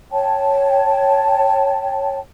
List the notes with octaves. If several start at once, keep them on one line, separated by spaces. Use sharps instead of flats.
C#5 G5 A5